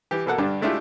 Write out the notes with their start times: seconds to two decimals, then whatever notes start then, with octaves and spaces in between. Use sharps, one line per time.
0.11 E3 G4
0.26 B2 A#3 A4 F#5
0.38 G2 D3 G3 D4
0.62 G#3 A3 D4 E4 F4 G4